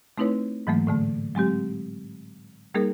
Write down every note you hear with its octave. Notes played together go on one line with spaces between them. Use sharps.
A3 C4 D#4 E4 B4 C#5
G#2 E3 F#3 A3 A#3
A2 D3 A3
F#3 G#3 C4 G4
G3 A#3 D#4 G#4 A#4